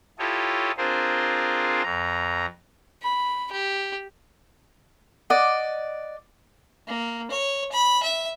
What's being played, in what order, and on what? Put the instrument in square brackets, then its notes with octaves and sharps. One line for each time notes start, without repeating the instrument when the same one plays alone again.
[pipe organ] E4 F4 G4 A4 C#5 D#5
C4 D4 F4 G#4 A#4 C5
F2 A#5
[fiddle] B5
G4
[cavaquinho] D5 D#5 F#5
[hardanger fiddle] A#3
C#5
B5
E5